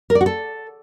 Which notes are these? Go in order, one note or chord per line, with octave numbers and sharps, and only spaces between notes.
A#4
D5
F#4
A4